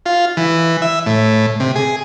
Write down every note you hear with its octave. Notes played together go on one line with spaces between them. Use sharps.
F4
E3
E5
A2
C3
G#4